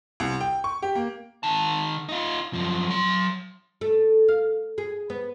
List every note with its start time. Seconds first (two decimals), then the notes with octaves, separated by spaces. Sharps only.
0.20 C2
0.41 G5
0.64 C#6
0.82 G4
0.95 A#3
1.43 D#3 A5
2.09 D#4 F4
2.53 F#2 F3
2.88 F#3 C6
3.81 A3
4.28 F5
4.78 G#4
5.10 B3